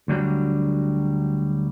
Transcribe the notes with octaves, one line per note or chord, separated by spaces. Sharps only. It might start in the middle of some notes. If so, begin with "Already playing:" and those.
D2 D3 F#3 G3